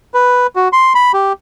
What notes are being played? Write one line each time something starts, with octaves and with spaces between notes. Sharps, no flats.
B4
F#4
C6
B5
G4